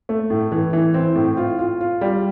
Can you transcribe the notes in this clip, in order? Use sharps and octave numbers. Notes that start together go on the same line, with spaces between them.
A3
A2
E3
E3
C4
A2
F4
F4
F4
G3